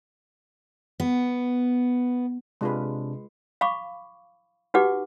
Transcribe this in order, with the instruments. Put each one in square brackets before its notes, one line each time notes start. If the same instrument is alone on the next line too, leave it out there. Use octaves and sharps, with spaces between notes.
[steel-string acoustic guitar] B3
[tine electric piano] C3 D4 [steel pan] G#3 F4 B4
[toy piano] F5 B5 C#6 D6
D#4 F#4 G4 B4 F#5 D6